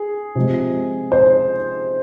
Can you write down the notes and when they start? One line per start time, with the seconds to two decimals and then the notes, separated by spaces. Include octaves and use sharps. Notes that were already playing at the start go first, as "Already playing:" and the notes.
Already playing: G#4
0.35 C3 F3 G#3
1.12 C5